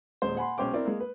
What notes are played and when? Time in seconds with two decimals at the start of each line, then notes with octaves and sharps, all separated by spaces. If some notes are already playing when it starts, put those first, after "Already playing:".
0.22 D#1 G#3 C5
0.37 F#5 G#5 B5 C6
0.58 B1 G#3 C#4 C5 G5 D6
0.74 C4 E4 A#4 D5
0.86 G#3 A#3
1.00 B4